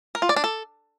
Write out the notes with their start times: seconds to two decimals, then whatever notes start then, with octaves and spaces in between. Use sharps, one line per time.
0.15 A#4
0.22 F4
0.29 D5
0.36 D4
0.44 A4